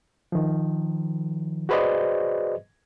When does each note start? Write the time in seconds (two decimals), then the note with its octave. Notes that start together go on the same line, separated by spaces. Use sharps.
0.32 D#3 F3
1.69 F#4 G#4 B4 C5 D5 D#5